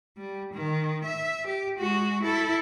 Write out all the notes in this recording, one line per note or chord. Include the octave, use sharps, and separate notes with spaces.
G3
D#3
E5
G4
G#3 F#4
E4 A4